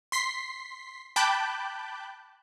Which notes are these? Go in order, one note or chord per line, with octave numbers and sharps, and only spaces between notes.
C6 B6 C7
G5 A5 B5 D6 F#6 G6